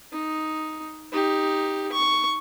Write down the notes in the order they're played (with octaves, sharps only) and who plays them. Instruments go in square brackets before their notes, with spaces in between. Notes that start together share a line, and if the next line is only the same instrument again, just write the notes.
[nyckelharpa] D#4
D#4 G4
C#6